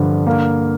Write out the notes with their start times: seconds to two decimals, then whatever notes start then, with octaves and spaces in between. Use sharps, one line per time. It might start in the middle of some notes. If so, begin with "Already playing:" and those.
Already playing: G2 D3 F3
0.27 A#3 F5